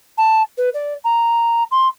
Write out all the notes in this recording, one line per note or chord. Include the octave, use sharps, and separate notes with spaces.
A5
B4
D5
A#5
C6